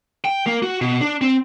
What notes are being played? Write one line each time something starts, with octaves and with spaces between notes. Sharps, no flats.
G5
A#3
F#4
B2
D4
C4